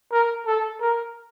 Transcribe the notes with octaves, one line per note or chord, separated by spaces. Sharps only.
A#4
A4
A#4